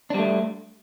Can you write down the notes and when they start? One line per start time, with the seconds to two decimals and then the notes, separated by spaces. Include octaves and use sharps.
0.10 D4
0.14 G3
0.18 A3